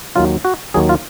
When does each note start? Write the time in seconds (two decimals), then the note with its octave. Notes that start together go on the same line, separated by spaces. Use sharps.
0.16 D#2 D#3 F#3 F4
0.45 F#4
0.74 D#2 D#3 F#3 G#4
0.89 F4